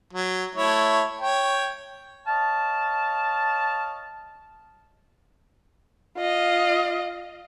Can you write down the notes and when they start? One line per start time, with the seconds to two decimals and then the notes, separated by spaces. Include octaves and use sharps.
0.13 F#3
0.55 A3 E4 C#5
1.21 C#5 G5
2.27 C#5 D#5 F5 A5
6.17 F4 D#5